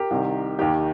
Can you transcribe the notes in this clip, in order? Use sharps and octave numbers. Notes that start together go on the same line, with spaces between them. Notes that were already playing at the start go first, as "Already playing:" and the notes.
Already playing: G4 A#4
C2 C3 D#3
D#2 D#3 G4